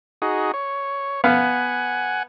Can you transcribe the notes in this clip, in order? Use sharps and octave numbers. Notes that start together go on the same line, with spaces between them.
D#4 F#4 G#4
C#5
B3 F5 F#5 G#5